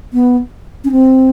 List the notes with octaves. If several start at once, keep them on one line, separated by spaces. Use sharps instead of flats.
B3
C#4
C4